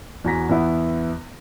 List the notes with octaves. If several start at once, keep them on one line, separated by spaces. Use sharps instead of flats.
E2 F#4 G#5 A#5 A#6 B6
E2 B3 E4